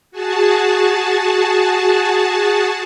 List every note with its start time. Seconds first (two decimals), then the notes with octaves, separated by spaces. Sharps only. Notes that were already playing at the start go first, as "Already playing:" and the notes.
0.11 F#4 G#4 A5